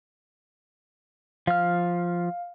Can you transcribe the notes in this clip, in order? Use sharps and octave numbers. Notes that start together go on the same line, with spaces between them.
F3 F5 F6